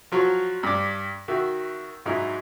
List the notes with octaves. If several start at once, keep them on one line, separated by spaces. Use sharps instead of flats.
F3 F#3 F#4 C#6
G2 D4 D6
D#3 F#4 E5
G#2 F#3 D#4 E4